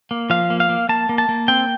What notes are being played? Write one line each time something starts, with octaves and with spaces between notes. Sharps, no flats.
A#3
F3 F5
A#3
F5
A#3
A#3 A5
A#3
A5
A#3
C4 G5